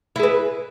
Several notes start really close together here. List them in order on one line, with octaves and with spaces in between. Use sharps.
E4 G#4 B4